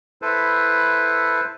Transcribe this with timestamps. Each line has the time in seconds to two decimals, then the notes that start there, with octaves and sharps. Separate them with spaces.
0.22 E4 A4 B4 C5